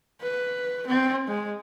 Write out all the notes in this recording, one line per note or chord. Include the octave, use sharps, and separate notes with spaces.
B4
C4
G#3